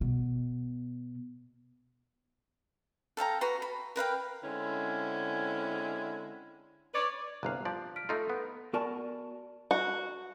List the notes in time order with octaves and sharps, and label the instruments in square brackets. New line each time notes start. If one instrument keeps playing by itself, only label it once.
[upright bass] B2
[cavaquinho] A4 F5 G5 A#5
F#4 B4 A#5 C6
B5
A#4 B4 F5 G5
[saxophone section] D3 G#3 C4 C#4 E4
B4 C#5 D5
[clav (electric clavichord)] G1 C2 F5 [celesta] A#5 F#6
[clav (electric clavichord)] F3 D5
[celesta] F6 B6 D7
[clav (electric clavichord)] A3 D#4 F4 [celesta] A4 C6
[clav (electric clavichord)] B3
[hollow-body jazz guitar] B3 F#4 A#4 D5 G#5 A5
[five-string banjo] F#4